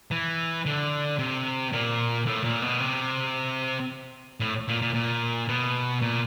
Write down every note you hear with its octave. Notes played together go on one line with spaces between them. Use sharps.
E3
D3
C3
A#2
A2
A#2
B2
C3
A2
A#2
A#2
A#2
B2
A#2